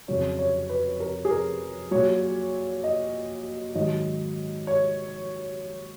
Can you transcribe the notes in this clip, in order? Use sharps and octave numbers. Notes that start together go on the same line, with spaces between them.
F2 C#3 F#3 C#5
C#5
B4
A#4
G#4
A#4
A#2 F#3 C#5
D#5
G#2 D#3 F#3 D#5
C#5